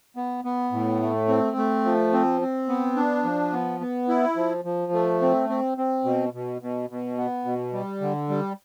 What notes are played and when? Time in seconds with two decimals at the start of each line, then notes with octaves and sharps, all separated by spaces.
0.16 B3
0.45 B3
0.72 A2
1.01 A3
1.28 C4
1.57 A3
1.85 F3
2.13 C4
2.41 C4
2.69 B3
2.96 D4
3.24 F3
3.53 B3
3.81 B3
4.09 E4
4.36 F3
4.65 F3
4.92 A3
5.22 C4
5.49 C4
5.78 C4
6.05 B2
6.33 B2
6.62 B2
6.90 B2
7.18 B3
7.45 B2
7.73 G3
8.01 D3
8.29 G3